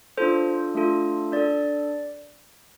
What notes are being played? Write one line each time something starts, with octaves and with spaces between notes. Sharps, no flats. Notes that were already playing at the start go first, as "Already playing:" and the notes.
D4 F4 A4 C5
A3 D4 F4 A4
D4 A4 D5